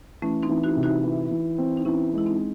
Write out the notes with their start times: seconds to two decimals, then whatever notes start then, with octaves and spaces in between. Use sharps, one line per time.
0.22 E3 A3 C#4
0.43 C4 D#4
0.50 E3
0.63 D#4 F#4
0.77 C3
0.83 D#4 F#4
1.04 E3
1.31 E3
1.58 C4
1.77 D#4
1.85 E3 C#4 E4
2.13 G#3 E4
2.26 C4 D#4